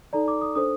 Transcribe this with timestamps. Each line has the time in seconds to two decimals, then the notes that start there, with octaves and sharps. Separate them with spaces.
0.13 D#4 A4 D5 A#5
0.28 D6
0.41 D#6
0.55 D4 A4 C5 D#6